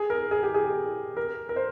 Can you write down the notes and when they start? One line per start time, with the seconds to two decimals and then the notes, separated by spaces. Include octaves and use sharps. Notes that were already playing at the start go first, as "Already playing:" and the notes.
Already playing: G#4
0.10 A#4
0.31 G#4
0.43 G4
0.54 G#4
1.17 A#4
1.49 A#4
1.56 C5